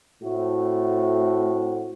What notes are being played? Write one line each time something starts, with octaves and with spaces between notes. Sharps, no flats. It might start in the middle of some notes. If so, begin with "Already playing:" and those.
A2 A3 C4 F#4